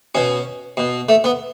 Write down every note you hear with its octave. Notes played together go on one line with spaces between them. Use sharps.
B2 C#4
B2
A3
B3